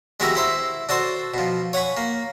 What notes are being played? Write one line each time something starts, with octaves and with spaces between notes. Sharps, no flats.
G#3 B3 F#4 G4 A#4 E5
E4 C5 E5
D4 F#4 A4 C5
B2 F3
C#5 F#5 G#5 B5 C#6
A#3